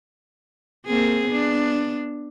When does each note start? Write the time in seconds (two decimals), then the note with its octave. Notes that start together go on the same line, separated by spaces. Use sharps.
0.86 A#3 C4 G#4
1.28 B3 D4